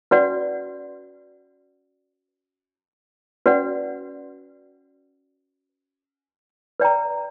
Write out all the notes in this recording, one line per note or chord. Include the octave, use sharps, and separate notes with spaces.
C#4 F#4 B4 D5 F#5
C#4 F#4 B4 D5 F#5
B4 D5 G5 A#5